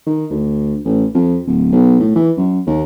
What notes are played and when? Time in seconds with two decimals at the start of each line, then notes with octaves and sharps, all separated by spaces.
0.06 D#3
0.31 D2
0.85 A1
1.15 F2
1.47 D1
1.72 B1
1.99 A2
2.15 E3
2.37 F#2
2.67 D#2